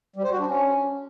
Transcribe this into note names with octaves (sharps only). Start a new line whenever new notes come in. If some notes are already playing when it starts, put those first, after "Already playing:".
G3
C5
F#4
D4
C#4